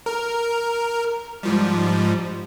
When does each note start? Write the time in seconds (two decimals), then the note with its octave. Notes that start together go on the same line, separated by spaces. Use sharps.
0.06 A#4
1.43 G#2 F3 G3